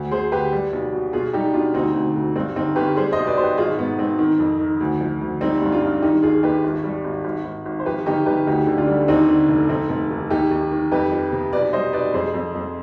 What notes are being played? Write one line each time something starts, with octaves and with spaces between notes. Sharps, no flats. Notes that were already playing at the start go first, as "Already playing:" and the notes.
Already playing: D2
D2 G#4 C5
D2 G4 B4
G3
B1
B2
B2 F4 G#4
G3 D#4 G4
B2 D4 F4
D2 C4 D#4
D2
D2
G2 C4
G1 C4 D#4
G1 G4 B4
G3 G#4 C5
C5 D#5
B1
B4 D5
B2 C5
G4 B4
G#1 F4 G#4
G#2 B3
G#2 C4
D#3
F2
D#3
D2
F3
D2
G3 C4 D#4
G2
D4 F4
G2
D#3 D#4 G4
D#2 F4 G#4
D#2 G4 B4
G#1
G3
G#1
G#1
G#1
G#1
C5
F3 G4 B4
G1 D#4 G4
G1 G4 B4
D2 D#4 G4
D3
D4 F4
G3
D#2 C4 D#4
D3
F1
F1 C4 D#4
F1
D#2
D#2 D#4 G4
D#2
D#3
F2 G4 B4
F3
C3
B1 B4 D5
G3 C5 D#5
B1 B4 D5
F2 G#4 C5
F2
F2